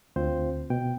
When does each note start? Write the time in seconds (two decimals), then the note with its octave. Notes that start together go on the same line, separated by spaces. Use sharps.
0.16 D2 C4 F4 C5
0.70 B2 G5